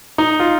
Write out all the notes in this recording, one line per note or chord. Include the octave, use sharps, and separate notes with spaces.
D#4
F4